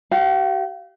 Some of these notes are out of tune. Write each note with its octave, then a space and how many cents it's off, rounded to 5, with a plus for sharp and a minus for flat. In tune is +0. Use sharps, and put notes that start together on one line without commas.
G4 -40 F5 -10